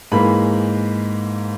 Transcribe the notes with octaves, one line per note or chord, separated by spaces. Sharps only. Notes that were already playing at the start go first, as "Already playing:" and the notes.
G#2 E3 A#3 B5